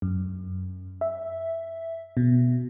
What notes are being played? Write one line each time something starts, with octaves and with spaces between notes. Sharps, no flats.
F#2
E5
B2